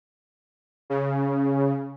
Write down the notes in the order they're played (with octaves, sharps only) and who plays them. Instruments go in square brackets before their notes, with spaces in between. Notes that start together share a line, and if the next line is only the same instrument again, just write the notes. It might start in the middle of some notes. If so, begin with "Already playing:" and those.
[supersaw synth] C#3